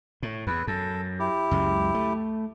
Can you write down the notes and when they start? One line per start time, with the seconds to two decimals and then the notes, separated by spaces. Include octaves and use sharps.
0.23 A2
0.47 E2 B4
0.67 F#2 A4
1.19 E4 G4
1.51 C#2 F#2 G#3
1.94 A3